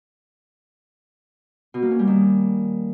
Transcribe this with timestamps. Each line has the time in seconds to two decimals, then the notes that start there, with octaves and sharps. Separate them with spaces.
1.74 B2
1.82 A#3
1.91 C#4
1.99 G3
2.07 D#3